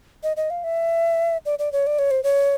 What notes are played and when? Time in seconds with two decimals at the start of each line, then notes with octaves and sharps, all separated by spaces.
0.23 D#5
0.37 D#5
0.50 F5
0.64 E5
1.46 D5
1.59 D5
1.72 C#5
1.87 D5
1.99 C#5
2.11 C5
2.24 C#5